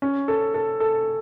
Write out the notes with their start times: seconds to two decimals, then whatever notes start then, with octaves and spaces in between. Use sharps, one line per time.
0.02 C#4
0.28 A4
0.54 A4
0.80 A4